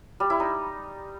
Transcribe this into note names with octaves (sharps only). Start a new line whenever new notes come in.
G3
E4
D#4